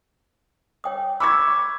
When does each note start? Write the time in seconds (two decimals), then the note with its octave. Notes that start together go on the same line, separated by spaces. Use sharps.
0.84 C#5 G5 D#6
1.20 A#5 B5 C#6 D6 E6 G#6